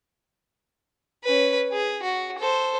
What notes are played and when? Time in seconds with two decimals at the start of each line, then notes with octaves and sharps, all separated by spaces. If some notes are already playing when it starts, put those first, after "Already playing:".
1.24 C#4 B4
1.72 G#4
2.03 F#4
2.39 A4 C5